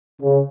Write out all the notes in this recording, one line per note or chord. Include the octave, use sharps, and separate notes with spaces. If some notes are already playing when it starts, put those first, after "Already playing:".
C#3